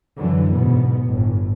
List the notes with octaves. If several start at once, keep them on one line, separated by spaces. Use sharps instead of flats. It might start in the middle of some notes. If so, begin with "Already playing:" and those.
F#2 D3 E3 F#3
E2 G#2 B2 B3
G1 A2